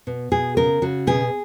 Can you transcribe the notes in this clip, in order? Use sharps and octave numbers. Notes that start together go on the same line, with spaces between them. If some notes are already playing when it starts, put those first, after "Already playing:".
B2
B2 G#4
C#3 A#4
C#3 F#4
B2 G#4